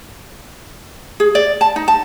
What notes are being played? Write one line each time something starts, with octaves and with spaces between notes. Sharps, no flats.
G#4
D5
A5
D#4
A5